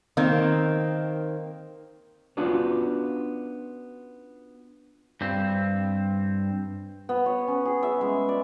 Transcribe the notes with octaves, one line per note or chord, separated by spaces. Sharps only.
D#3 A#3 C4
B3 C#4 D4 F4 F#4 D5
G2 C4
B3
C#5
C#4
G#4
E5
G#3
D5